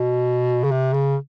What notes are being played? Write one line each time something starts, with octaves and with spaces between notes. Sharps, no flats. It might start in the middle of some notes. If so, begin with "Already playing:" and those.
Already playing: B2
C#3
C3
C#3